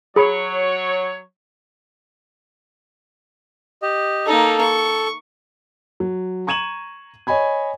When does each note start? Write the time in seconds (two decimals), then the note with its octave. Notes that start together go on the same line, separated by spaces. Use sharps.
0.16 F#3 G#4 C#5 B5
3.82 G4 D#5
4.26 A#3 D#4 A4
4.61 C#6
6.00 F#3
6.47 A#5 C#6 G#6 D#7 E7 F#7
7.27 C#5 D#5 G#5 B5 G#6